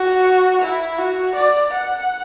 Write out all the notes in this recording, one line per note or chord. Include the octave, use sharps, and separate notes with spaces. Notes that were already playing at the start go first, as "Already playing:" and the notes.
Already playing: F#4
E4
F#4
D5
F#5